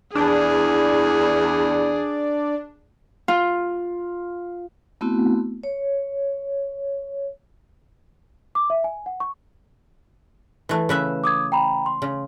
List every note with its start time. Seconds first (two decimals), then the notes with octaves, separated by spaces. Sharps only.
0.15 E2 D4 G#4
3.28 F4
5.01 A3 B3 C4 E4 F#4
5.63 C#5
8.55 D6
8.70 E5
8.84 G#5
9.06 F#5
9.20 C#6
10.69 E3 A3
10.89 C#3 B4 E5
11.24 D6 D#6 G#6
11.52 G5 A#5 B5
11.86 C6
12.02 C#3